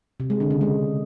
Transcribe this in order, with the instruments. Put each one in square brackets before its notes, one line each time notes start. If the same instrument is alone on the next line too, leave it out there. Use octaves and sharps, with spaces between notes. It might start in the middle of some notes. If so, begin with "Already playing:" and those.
[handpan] C3
G#3
D3
C#3
G#3